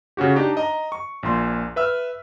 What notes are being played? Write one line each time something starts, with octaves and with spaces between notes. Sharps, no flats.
C#3 C#4 F#4 G4
D4 D#4 G4
D#5 A#5
C#6
A#1 A#2 C6
B4 E5 E6 F6